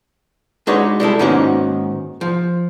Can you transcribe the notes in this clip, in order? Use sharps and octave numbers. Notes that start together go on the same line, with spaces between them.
G#3 D4 D#4 F#4 B4 C#5
G3 G#3 E4 A4
G#2 D#3 A#3 B3 C#4 F#4
F3